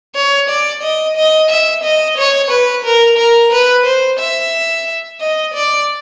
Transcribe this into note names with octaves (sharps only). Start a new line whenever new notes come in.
C#5
D5
D#5
D#5
E5
D#5
C#5
B4
A#4
A#4
B4
C5
E5
D#5
D5